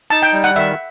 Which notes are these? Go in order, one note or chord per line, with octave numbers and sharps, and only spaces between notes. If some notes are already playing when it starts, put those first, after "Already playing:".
D#4 A5
G5
G3
F#5
D#3 E5